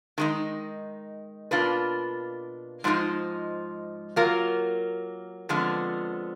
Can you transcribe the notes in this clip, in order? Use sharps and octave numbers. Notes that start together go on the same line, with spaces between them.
D#3 G#3 D#4
B2 A#3 D4 F4 B4
G#2 F3 G#3 D#4
F#3 A#3 F4 A#4
F2 D3 F3 G#3 B3